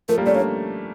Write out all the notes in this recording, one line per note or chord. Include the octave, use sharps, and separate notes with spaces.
F3 A3 A#4
G3 A#3
A3 C#4 D5
A#3 D4 C#5